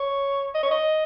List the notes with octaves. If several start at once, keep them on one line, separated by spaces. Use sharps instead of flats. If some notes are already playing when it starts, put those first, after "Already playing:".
Already playing: C#5
D#5
C#5
D#5